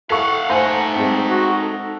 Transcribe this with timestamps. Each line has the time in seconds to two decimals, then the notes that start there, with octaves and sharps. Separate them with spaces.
0.10 E4 A4 F5 F#5 C#6
0.50 A3 D#4 C5 F#5 G#5 A5
0.96 G#3 C4
1.29 F#4
1.62 A4